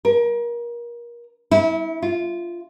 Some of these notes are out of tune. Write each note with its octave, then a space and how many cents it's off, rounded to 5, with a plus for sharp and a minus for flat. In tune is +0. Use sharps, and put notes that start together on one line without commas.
A#4 +30
E4 -30
F4 -10